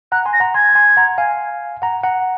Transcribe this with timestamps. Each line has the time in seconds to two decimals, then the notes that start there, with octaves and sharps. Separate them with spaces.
0.12 F#5 A#5 F#6
0.26 G#5 C6
0.33 A#6
0.40 F#5 A#5
0.54 G#5 C6 G#6
0.75 G#5 C6
0.97 F#5 A#5
1.18 F5 G#5
1.82 F#5 A#5
2.04 F#5 A#5